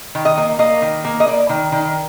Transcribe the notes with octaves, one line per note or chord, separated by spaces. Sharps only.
D#3
D#5
A#3
A#3 D#5
D#3
A#3
D#5
A#3 D5
D#3
D#3